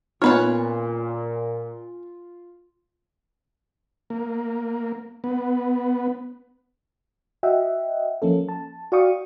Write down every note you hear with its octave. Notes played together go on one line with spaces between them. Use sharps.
A#2 B3 C#4 D#4 F4 B4 C#5 F6
A#3
B3
F#4 D#5 E5 F#5 G5
F3 A#3 C#4 A4
A5
F#4 D5 F5 G5 C#6 D#6